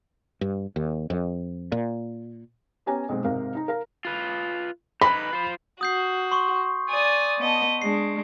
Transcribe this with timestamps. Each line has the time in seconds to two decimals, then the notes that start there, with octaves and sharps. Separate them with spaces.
0.41 G2
0.76 D#2
1.10 F2
1.72 A#2
2.86 B3 C#4 G4 G#5 A#5
3.09 B1 G#3 C4
3.24 G#2 C3 A#4 F5
3.55 D#4 A#5
3.68 A#4 F5 A#5
4.05 F4 B4
5.01 D#4 B4 B5
5.33 F4 C5
5.81 F#4 D#6 G6 C7
6.31 C6 C#6
6.89 D5 G#5 D#6
7.40 B3 D#5 A5
7.82 G#3 D4 C7